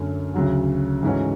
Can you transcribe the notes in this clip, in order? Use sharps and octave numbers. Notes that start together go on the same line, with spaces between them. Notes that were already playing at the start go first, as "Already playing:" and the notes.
Already playing: F#2 D3 A3
D2 C#3 F#3 C#4 F#4
G#2 E3 A3 C#4 F#4